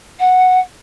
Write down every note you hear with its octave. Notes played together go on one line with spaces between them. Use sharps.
F#5